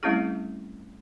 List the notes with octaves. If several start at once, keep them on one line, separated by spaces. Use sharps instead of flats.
G3 A3 C4 C#4 E4 G#4